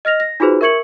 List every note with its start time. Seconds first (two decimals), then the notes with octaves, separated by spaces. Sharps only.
0.05 D#5 F6 A#6 F7
0.20 A#6
0.40 D#4 F4 F#4 G#4 B4 C5
0.61 A#4 E5 C#6 G#6 C#7 F#7